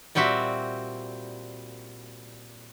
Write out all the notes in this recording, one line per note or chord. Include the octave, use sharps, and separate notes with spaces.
A#2 G3 C4 F#4 E5